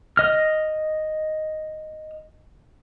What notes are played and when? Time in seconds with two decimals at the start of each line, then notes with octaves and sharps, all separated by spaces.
0.17 D#5 F6